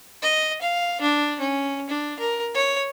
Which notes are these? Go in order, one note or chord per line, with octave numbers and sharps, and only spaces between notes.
D#5
F5
D4
C#4
D4
A#4
C#5